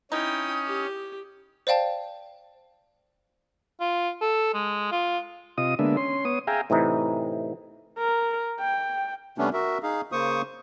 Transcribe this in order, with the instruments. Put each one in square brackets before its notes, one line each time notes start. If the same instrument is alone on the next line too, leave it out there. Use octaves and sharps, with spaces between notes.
[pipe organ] C#4 [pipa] D#4 [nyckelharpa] E4 G5 [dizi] D#6
[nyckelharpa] G4
[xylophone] C5 D5 F5 G5 A5
[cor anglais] F4
A4
G#3
F4
[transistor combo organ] C3 F4 D#5 D#6
D3 G#3 A#3 B3 D4 E5
C#4 C6
B3 C#5 D#6
G#4 E5 F5 G5 G#5 A#5
[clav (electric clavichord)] A2 C3 E3 D#4
[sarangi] A#4
G5
[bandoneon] C3 G3 A3 B3 C#4 D4
F#4 A#4 E5
D#4 G#4 F5
C#3 A#3 C5 C#6 D#6